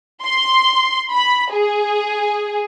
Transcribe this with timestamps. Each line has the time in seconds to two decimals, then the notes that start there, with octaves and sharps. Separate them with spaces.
0.23 C6
1.11 B5
1.53 G#4